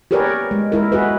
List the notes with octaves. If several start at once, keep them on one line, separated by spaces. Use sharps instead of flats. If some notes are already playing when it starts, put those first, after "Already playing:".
G4 G#4 A#4 B4 C#5 D5
G#3
G#3 E4 A#4
F#4 G#4 B4